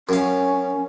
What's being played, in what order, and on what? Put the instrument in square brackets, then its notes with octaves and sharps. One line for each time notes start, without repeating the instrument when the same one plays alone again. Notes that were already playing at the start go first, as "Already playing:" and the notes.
[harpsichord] F#2 F5 [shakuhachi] C#4